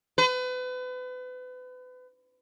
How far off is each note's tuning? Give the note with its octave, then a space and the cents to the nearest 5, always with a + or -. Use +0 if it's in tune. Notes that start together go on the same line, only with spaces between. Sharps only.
B4 +35